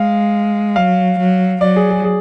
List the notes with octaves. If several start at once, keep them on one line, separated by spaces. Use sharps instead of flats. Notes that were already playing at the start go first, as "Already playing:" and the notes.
Already playing: G#3 F5
F#3 F5
F#3
F#3 D5
G#4
G#4
G#4